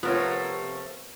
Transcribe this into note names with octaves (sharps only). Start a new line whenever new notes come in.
C3 F3 A3 B3 F4 A#4 C#5